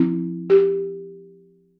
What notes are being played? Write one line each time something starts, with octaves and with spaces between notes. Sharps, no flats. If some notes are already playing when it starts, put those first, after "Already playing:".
Already playing: F3 C4 E4
G4